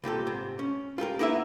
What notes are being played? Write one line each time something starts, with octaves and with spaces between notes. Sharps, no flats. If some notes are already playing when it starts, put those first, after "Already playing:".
C2 A#2 G4 A4
G#2 C3
C#4
F4 G4 A4 A#4
A#3 B3 D#4 E4 C5 E5